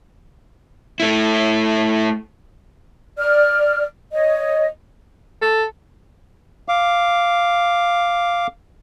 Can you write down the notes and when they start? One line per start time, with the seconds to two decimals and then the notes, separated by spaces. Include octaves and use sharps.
1.00 A3 E4
3.18 D5 F6
4.13 C#5 D#5
5.42 A4
6.69 F5 D6